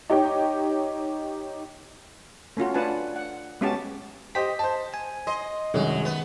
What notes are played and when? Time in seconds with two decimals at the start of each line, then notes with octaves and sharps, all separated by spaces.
0.10 D#4 G4 C#5 G5
2.57 A3 C#4 F4 F#4
2.74 D4 F4 B4 F#5 G#5 A5
3.16 F#5
3.61 G#3 B3 C#4 F#4 G4 A5
4.35 G4 C5 D#5 B6
4.59 C5 D#5 A5
4.94 G#5
5.27 D#5 C6
5.74 C2 F#2 D#3 F#3 G#3
6.05 B3